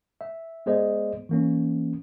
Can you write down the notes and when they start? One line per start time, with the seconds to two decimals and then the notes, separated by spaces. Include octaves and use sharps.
0.21 E5
0.66 G#3 B3 G#4 C5 D5 D#5
1.29 E3 A#3 C#4